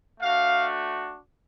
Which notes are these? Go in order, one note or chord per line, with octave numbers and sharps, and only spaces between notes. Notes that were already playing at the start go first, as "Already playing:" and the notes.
A3 D4 F#4 F5